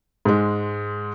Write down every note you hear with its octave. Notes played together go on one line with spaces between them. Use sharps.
G#2 G#3